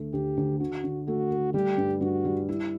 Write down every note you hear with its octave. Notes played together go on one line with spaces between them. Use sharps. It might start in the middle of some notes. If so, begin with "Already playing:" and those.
Already playing: D2 A3
D2 G4
D2
D3 F#4
D3
A3 F#4
A3
G3 G4
G2
G2 F#4
G3
E4